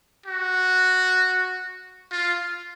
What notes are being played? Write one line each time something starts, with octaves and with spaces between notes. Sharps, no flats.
F#4
F4